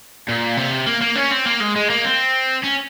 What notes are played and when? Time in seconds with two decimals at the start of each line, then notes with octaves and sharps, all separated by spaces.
0.28 A#2
0.57 C3
0.87 A#3
1.02 A#3
1.16 C#4
1.31 C4
1.46 A#3
1.60 G#3
1.76 G#3
1.90 A#3
2.04 C4
2.63 C#4